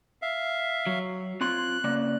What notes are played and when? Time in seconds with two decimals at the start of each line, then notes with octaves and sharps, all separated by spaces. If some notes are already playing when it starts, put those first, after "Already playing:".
0.22 E5 F5
0.87 F#3
1.41 C4 F4 C6 F#6
1.84 C#3 A#3 D5